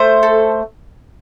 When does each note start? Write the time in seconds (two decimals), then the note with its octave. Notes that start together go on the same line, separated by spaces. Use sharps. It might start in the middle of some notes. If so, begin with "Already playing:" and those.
Already playing: A3 C5
0.23 A4